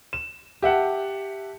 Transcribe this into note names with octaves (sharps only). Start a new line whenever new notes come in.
E7
G4 E5 F#5 A5